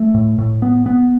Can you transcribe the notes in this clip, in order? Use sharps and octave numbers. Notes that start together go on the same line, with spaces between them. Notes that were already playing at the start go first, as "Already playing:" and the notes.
Already playing: A3
A2
A2
B3
B3